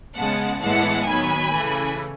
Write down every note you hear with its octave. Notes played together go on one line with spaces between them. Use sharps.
C#3 G#3 B3 F#5 A5
A2 E3 G#3 B3 F#5 A5
D#3 F#3 B3 G#5 B5
C#3 E3 A3